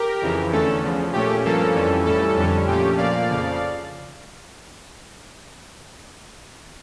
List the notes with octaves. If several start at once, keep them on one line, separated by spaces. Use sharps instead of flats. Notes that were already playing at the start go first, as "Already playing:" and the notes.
Already playing: G4 A#4
F2 C#3 E3
E2 D3 A3 C#4 A4
E2 C#3 F3
A#2 A3 C#4 G4
G2 F3 A#3 C#4 A4
F2 E3 G3 C#4
A2 E3 G3 C#4 A4
F2 D3 G3 C#4
A#2 F3 A3 C#4 G4
A#2 F3 A#3 D5 F5
F2 C#3 F3